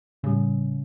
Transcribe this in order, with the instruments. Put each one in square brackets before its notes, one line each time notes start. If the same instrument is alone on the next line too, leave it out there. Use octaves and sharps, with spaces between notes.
[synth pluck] A2 G3 [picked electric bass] C#3